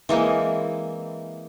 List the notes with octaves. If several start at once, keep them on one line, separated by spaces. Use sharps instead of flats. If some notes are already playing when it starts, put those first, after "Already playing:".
E3 G#3 A#3 C4